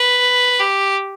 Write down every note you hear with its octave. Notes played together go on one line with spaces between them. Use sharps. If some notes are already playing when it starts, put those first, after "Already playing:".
Already playing: B4
G4